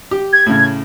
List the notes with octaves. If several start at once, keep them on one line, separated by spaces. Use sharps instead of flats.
G4
G#6
A2 C#3